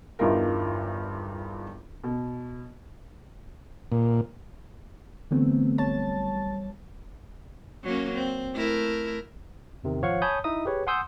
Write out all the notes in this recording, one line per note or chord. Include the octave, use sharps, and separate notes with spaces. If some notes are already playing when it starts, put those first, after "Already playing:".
G1 E2 G2 D#4 F4 A#4
B2
A#2
D3 E3 F#3 A3 B3 C4
G#1 G3 C#5 A5 A6
F#3 A#3 C#4
C4
A3 E4 A#4
E2 C3 D#3
G#1 F3 C#5 F5 F#5 C#6
C#5 G#5 A5 B5 D#6 G6
D#4 E4 D#5 E5 D#6
G4 G#4 B4 C#5
F#5 G#5 C6 D#6 E6 G6